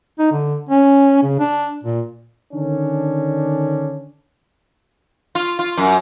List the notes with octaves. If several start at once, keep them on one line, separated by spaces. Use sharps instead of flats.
D#4
D3
C#4
C#3
D4
A#2
D3 D#3 C#4 D4
F4
F4
F#2